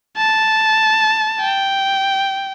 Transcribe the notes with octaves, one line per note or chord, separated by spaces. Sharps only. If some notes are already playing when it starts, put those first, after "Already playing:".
A5
G5